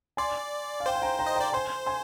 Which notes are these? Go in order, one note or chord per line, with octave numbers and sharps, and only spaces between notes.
D5 G#5 C6
F5
C5 G5
G#5
G5 A#5
G5 A#5
D#5
D5 G5 A#5
C5 G#5 C6
G#5 C6